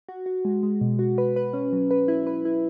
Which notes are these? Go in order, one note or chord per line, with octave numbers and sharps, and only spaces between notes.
F#4
F#4
G#3
G#3
B2
F#4
B4
B4
C#4
F#3
B4
E4
B4
E4